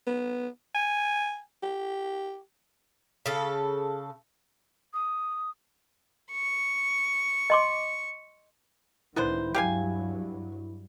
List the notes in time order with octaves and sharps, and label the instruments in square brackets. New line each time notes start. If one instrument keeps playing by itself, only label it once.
[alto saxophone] B3
G#5
G4
[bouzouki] C#3 A4
[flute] D#6
[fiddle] C#6
[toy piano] D#5 C6 D6
[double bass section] C#2 A2 D#3 [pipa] B3 D4 C5 [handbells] E4
[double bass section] G2 F#3 [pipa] G4 F5 G#5